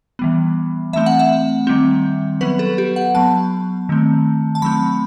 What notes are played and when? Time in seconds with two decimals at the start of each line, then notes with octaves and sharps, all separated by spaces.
0.19 E3 G3 B3
0.93 E3 A3 C4 E5
1.06 F#5
1.19 E5
1.67 D#3 G3 C4
2.41 F#3 B3 B4
2.59 A4
2.78 G4
2.96 F#5
3.14 F#3 B3 A5
3.89 D#3 A3 C4
4.55 A5
4.62 F#3 A3 C4 B5